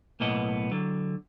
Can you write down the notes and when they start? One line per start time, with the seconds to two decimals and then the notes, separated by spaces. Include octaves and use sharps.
0.20 B1 A2 A#3 B3 D#5
0.72 D3 F#3